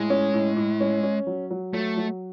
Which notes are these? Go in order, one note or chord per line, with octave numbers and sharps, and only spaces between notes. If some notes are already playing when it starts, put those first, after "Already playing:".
Already playing: A2 G#3
C#4
A2
A2
C#4
C#4
F#3
F#3
F#3 A3
F#3